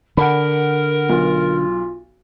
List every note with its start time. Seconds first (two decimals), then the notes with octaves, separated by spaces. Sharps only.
0.17 D3 A#4 F#5 B5
1.09 B1 F4